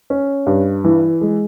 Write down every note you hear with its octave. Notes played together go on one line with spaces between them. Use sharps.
C#4
G2
E3
G#3